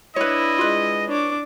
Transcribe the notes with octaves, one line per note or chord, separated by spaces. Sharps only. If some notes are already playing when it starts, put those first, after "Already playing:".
D4 E4 B4 C#5 D#5
G#3 F4 B4
D4 C#5 D6